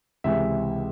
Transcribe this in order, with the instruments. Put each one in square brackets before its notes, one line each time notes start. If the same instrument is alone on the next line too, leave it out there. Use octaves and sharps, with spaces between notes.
[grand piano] C#2 C3 E3 E5